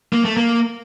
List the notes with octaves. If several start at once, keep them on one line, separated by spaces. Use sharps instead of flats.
A#3
A3
A#3